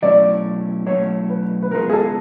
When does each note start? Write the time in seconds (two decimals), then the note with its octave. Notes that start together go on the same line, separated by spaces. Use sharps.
0.02 B2 F#3 A3 C#4 E4 D5
0.86 B2 F#3 A3 C#4 E4 C#5
1.30 B4
1.63 B4
1.71 C#3 F3 G#3 B3 A#4
1.90 G#4
1.93 A4